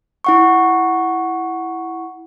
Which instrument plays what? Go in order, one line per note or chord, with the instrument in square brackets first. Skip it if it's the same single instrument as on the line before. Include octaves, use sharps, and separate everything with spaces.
[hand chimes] E4 F#5 C#6